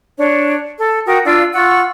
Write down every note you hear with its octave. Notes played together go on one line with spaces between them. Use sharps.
D4 C#5
A4
F#4 A#4 G5 D#6
D4 F4 F5 E6
F4 F#5 C#6 E6